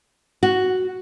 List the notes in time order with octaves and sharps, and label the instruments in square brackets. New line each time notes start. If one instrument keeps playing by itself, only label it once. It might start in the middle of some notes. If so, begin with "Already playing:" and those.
[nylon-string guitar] F#4